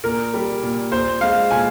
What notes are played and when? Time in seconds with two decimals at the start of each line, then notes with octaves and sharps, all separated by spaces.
0.04 A#2 A#4
0.34 G3
0.63 A#2
0.91 A#2 C5
1.21 G#3 F5
1.51 A#2 G#5